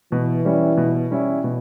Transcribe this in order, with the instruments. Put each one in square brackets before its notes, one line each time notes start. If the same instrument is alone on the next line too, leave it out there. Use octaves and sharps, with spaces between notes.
[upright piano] B2 [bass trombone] E3
[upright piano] G3 C#4 E4
B2
G3 C#4 E4
B2